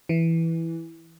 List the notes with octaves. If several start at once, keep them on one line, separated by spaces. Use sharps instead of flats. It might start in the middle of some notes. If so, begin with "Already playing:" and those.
E3